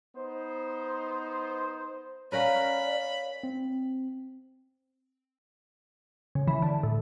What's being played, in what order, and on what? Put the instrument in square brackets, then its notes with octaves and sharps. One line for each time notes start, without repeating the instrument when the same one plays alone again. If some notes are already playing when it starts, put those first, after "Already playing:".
[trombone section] B3 D#4 C5
[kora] C#4 A#4 B4 [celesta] C#5 F5 [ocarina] D5 [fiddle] B5
[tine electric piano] C4
[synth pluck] C#3
E3
D3
A2